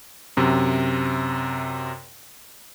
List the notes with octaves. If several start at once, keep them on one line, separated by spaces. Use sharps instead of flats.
F#2 C3